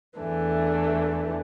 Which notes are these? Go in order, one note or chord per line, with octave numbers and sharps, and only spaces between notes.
E2 E3 A3 D4